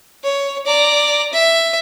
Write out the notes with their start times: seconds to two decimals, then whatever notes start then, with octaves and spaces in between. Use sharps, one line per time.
0.24 C#5
0.66 D5 A#5
1.33 E5